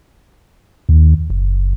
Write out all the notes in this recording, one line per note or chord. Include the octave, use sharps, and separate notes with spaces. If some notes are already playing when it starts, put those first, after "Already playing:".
D#2
F#1